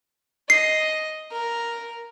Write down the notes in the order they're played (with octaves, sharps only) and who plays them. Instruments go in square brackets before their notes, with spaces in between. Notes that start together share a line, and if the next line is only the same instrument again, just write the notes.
[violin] D#5 [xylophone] C7
[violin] A#4